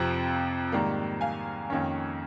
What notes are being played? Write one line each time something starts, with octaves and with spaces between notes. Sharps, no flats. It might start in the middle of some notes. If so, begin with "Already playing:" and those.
Already playing: F2 C3 F3 C4 A#5
G#2 D#3 G3 A#3
F5 G#5
F2 D#3 A#3 C#4